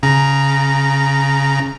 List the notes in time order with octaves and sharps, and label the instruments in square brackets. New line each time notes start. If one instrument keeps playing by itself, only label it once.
[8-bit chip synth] C#3 A#5